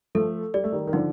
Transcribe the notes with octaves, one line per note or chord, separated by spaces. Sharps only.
F3 A3 A4
G3 D5
A3
D#3 G3
D#3
D3 F3 D#4